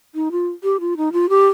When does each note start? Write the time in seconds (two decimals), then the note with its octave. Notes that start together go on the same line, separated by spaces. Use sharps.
0.15 D#4
0.32 F4
0.64 G4
0.80 F4
0.97 D#4
1.13 F4
1.29 G4